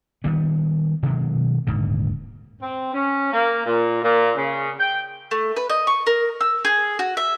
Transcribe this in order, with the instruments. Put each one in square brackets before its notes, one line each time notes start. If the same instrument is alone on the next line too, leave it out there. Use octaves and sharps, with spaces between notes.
[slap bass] D#3 G3 B3
B2 D#3 F#3 G#3
D#1 G#2 D3
[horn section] C4
C#4
A#3
A#2
A#2
C#3
G5
[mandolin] A3
B4
D#5
C#6
A#4
E6
G#4
F#4
E5